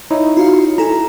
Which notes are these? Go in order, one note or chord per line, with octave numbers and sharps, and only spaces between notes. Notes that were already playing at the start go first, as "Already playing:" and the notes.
D#4 E4 C#5
F4 F#4 F5
E4 A4 G#5 A#5